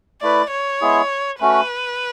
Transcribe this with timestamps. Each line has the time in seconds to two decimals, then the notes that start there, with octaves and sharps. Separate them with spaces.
0.22 A3 E4 B4 D5
0.51 C#5
0.81 G#3 B3 E4 G#4
1.41 A3 C#4 F#4 B4